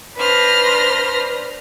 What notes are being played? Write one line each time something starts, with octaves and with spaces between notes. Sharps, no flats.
D4 B4 C5 F6 A#6